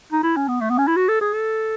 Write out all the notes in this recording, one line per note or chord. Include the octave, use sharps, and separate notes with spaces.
D#4
E4
C#4
B3
A3
B3
C#4
E4
F#4
A4
G#4
A4